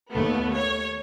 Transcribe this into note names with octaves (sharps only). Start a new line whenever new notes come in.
D#2 A3 B3
C#5